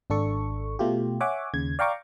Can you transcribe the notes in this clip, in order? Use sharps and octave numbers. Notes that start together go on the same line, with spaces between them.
G#1 D4 A4 C#6
B2 A3 F4 G4
C#5 E5 F#5 G#5 D6
D#2 C#3 G#6
D5 F5 G5 A#5 C#6 D6